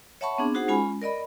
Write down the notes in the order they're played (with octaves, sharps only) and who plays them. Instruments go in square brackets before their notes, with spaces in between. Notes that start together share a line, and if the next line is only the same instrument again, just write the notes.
[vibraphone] C#5 E5 F#5 A5 B5 C#6
B3 C4 D4 G#4
D#4 F#4 G#4 C5 F#5
G#3 C#4 F4 G#5 B5
A#4 D5 D#5 B5